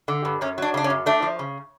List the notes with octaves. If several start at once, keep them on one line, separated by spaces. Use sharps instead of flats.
D3
G2
F#2 C#4
F#3 D4
C#3 D4
C#4
F#2
A3 D4
F3
C#3